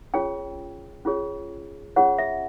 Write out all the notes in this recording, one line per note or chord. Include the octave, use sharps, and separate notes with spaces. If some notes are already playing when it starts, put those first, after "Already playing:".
C#4 F4 G#4 C#5 G5
C#4 F4 G#4 C#5
C#4 F4 G#4 C#5 F#5
E5